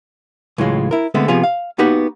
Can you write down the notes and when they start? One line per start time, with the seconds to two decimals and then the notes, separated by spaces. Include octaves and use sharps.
0.58 C#2 A2 E3 F#3 G#3 F4
0.91 E4 A#4
1.14 D3 G#3 A3 B3 C4
1.28 C3 F3 B3 F4 G#4
1.43 F5
1.78 A#3 B3 D#4 F#4 G4 B4